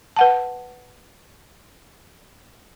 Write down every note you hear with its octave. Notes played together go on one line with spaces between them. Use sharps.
B4 F#5 A5